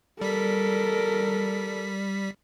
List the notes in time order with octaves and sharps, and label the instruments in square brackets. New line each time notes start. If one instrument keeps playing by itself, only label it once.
[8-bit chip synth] G3 B6 [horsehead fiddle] A4 A#4